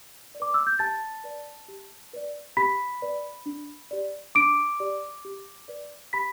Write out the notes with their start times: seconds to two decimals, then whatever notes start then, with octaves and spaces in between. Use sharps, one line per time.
0.35 D5
0.40 B4 D6
0.54 E6
0.67 G6
0.79 G4 A5 A6
1.24 B4 D5
1.68 G4
2.13 B4 D5
2.57 G4 B5 B6
3.02 B4 D5
3.46 D4
3.91 G4 D5
4.35 D4 D6 D7
4.80 G4 D5
5.25 G4
5.68 B4 D5
6.13 G4 B5 B6